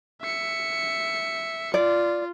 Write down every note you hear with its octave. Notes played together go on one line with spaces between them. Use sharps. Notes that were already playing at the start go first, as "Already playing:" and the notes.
E5 C#7
F4 D5